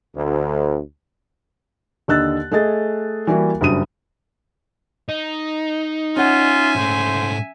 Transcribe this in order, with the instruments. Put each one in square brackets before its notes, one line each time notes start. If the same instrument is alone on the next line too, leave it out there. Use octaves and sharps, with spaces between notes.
[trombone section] D2
[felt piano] D#2 D3 D#5 E6 F#6 A6
A3 G#4 D#5 A6
E3 G3 A#3 E4 F#4
F#1 G2 F#3 D#6 D#7
[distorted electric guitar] D#4
[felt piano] C#4 F#5 [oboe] F4 [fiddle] E5 G#5
[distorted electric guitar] G#2 A3 [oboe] C5